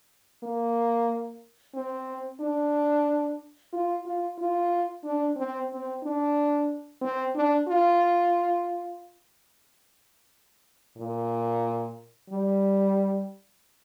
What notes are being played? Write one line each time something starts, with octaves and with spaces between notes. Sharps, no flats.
A#3
C4
D4
F4
F4
F4
D4
C4
C4
D4
C4
D4
F4
A#2
G3